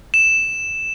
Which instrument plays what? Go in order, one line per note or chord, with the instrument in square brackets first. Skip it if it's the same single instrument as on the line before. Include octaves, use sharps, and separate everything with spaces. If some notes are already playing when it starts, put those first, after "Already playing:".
[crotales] E7